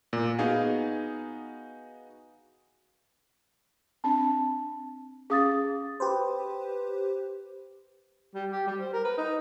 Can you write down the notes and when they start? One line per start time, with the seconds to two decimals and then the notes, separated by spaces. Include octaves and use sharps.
0.13 A#2
0.39 B3 D#4 F#4 G#4 F5 G#5
4.04 C4 D4 A5
5.30 C#4 G#4 F5 D#6 A6
6.00 G4 B4 C5
8.34 G3
8.52 G4
8.67 G3
8.80 C5
8.93 A#4
9.04 B4
9.17 D#4